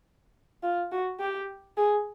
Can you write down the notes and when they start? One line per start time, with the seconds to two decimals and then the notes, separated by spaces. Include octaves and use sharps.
0.63 F4
0.92 F#4
1.20 G4
1.77 G#4